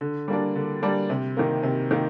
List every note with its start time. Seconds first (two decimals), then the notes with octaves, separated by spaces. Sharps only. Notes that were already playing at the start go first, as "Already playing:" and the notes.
0.01 D3
0.28 G3 A#3 D4
0.56 D3
0.82 G3 A#3 D4
1.10 C3
1.37 D#3 A#3
1.63 C3
1.91 D#3 A#3